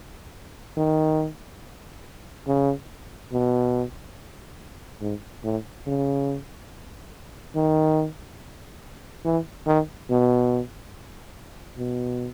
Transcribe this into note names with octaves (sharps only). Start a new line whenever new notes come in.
D#3
C#3
B2
G#2
A2
C#3
D#3
E3
D#3
B2
B2